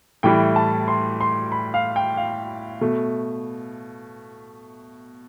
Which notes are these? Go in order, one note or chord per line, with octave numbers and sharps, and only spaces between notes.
A2 E3 G3 G5
A5
C6
C6
B5
F5
G5
F5
B2 A3